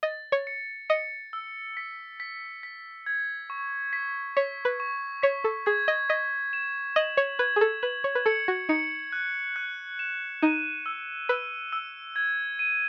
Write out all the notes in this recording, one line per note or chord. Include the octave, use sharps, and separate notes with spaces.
D#5 A6
C#5
C#7
D#5 C#7
E6
B6
B6
B6
G#6
C#6
B6
C#5 B6
B4
C#6
C#5 B6
A4
G#4 G#6
D#5
D#5 B6
E7
D#5 F#7
C#5
B4 G#6
G#4
A4
B4 F#7
C#5
B4
A4 C#7
F#4
D#4 C#7
F#6
F#6
E7
D#4 D#7
E6
B4 E6
E6
G#6
D#7